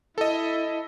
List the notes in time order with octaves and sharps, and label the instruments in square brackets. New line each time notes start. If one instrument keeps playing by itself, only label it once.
[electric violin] E4 [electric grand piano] A4 D#5